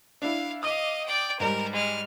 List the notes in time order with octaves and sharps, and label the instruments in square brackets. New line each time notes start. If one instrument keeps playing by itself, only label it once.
[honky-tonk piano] D4 E4 [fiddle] F5
[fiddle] D#5 F5 [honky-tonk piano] D6 D#6
[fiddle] D5 G5
[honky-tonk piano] G#2 G3 [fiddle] A#4
[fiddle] G#3 F6